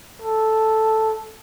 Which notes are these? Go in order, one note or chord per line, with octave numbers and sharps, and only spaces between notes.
A4